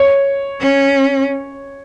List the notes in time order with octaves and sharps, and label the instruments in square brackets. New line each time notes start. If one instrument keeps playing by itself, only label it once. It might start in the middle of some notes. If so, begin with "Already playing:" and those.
Already playing: [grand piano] C#5
[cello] C#4